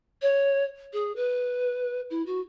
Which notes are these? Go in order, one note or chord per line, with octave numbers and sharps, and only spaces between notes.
C#5
G#4
B4
E4
F#4